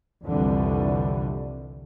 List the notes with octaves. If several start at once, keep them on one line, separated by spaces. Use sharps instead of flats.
C2 F2 D3 E3 G3